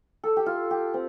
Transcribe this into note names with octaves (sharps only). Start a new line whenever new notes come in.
A4
G4
F4
G4
C4